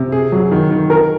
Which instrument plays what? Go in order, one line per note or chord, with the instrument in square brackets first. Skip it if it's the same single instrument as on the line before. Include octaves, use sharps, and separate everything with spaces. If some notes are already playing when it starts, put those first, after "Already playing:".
Already playing: [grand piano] C3
G#4
F#3
D#3
D#3
A#4